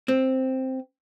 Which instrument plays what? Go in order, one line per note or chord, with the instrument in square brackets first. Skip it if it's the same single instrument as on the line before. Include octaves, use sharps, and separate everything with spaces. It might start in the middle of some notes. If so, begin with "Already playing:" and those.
[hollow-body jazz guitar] C4